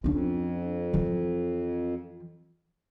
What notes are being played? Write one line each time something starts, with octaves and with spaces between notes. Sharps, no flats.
F2 C#4 D4
E3 F3